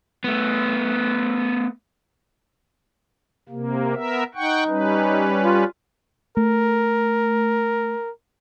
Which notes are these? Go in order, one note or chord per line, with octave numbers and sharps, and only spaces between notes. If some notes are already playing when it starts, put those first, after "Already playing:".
A3 B3
C3 A#3
B3 A#4 E5
D#4 F#5 G5 C#6
G3 C#4 B4
F4
A3 A#4